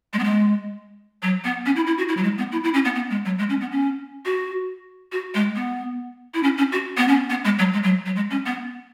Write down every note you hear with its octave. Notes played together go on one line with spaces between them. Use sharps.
G#3
B3
G#3
F#3
B3
C#4
E4
E4
F#4
E4
F#3
G#3
B3
E4
E4
C#4
B3
B3
G#3
F#3
G#3
C#4
B3
C#4
F#4
F#4
G#3
B3
E4
C#4
C#4
F#4
B3
C#4
B3
G#3
F#3
G#3
F#3
F#3
G#3
C#4
B3